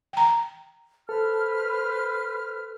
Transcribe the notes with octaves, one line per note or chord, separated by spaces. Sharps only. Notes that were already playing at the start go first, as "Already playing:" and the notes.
G5 A#5
A4 B4 C5 F6